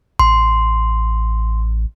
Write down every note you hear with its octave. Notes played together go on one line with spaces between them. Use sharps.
A1 C6